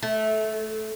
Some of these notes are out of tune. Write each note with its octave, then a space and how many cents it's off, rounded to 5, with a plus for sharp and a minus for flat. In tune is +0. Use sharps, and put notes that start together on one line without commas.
A3 -15